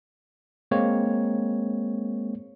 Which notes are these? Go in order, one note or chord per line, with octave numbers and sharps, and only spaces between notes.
G#3 A#3 C4 C#5